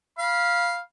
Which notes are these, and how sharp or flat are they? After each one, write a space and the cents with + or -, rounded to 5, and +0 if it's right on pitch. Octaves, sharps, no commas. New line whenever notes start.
F5 +0 B5 -25